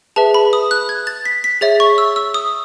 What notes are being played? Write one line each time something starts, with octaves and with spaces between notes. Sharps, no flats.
G#4 B4 E5 A5
B5
D#6
F#6
G#6
A6
B6
B6
G#4 C#5 E5 A6
C#6
E6
E6
D#6